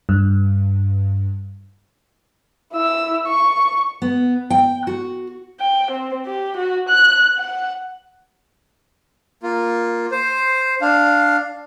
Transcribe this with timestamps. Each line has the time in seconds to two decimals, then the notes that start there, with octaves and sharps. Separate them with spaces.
0.09 G2
2.73 E4 E6
3.27 C#6
4.02 B3
4.50 G5
4.87 F#4
5.60 G5
5.91 C4
6.26 G4
6.57 F#4
6.89 F#6
7.38 F#5
9.43 A#3 F4
10.12 C5
10.81 D4 F5